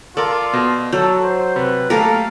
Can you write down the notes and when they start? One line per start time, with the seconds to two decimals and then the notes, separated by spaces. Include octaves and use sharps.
0.17 F4 A4 A#4 D5 A5
0.53 B2
0.92 F#3 A4 G6
1.23 C5
1.56 C3 B4
1.90 A3 A#3 G4 A4 A#4 F5